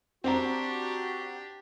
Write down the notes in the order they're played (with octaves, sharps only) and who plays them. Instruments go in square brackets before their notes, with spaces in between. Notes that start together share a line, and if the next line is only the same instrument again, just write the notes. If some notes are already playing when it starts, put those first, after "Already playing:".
[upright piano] C4 A#5 [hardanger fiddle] D4 G4 [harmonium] F#4